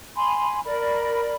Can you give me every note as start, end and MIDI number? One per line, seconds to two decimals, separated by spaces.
0.15 0.59 80
0.15 0.59 83
0.15 0.59 84
0.65 1.34 70
0.65 1.34 74
0.65 1.34 83